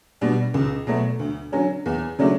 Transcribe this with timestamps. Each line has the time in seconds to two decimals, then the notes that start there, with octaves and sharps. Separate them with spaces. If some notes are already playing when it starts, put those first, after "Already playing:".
0.21 B2 G3 D4
0.54 C#2
0.87 B2 F#3 A3
1.19 D2
1.52 D3 F#3 C#4
1.86 E2
2.19 C#3 F#3 A3 D4